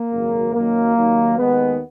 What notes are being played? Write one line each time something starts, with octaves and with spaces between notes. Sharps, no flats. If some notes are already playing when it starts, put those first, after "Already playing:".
Already playing: A#3
G#1 F#2 C#3 F#3
F#2 D#3 F#3 A#3
D#2 D#3 F#3
D#2 D#3 G#3 B3